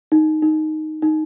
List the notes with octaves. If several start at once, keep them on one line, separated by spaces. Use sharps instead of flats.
D#4
D#4
D#4